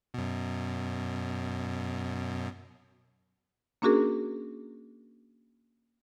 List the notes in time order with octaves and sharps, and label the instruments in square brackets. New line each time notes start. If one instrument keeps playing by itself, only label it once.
[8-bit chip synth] F#2 B2
[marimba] A#3 C#4 D4 F#4 G#4 A#4